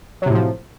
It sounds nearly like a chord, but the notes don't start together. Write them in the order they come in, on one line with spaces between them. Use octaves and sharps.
F#3 C3 A2 F3